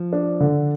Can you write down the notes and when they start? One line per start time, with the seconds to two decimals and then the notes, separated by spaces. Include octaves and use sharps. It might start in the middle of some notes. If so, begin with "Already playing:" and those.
Already playing: F3
0.13 D4
0.40 D3